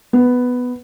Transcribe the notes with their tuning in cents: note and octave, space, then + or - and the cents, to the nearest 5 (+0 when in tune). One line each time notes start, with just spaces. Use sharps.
B3 +5